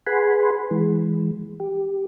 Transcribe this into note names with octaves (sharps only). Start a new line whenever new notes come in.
G#4 B4 F#5 G#5 B5 C6
E3 G#3
G4